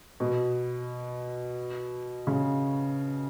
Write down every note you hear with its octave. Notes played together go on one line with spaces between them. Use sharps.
B2
C#3